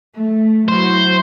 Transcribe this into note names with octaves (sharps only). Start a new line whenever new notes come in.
A3
F#3 E4 F#4 C5